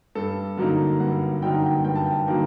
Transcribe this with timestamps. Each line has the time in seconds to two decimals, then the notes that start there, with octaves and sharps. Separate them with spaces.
0.15 G2 A4
0.57 D3 F#3 A#3 D#4
1.00 G2 F#5
1.42 D3 F#3 A#3 D#4 G5
1.54 F#5
1.66 G5
1.84 G2 G5
1.96 A5
2.06 G5
2.27 D3 F#3 A#3 D#4